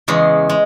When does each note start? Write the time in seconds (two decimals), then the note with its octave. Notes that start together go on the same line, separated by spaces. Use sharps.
0.08 E2 C#3 G#3
0.49 G#3